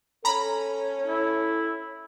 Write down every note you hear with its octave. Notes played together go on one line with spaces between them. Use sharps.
C#4 A4 A#5 B5
E4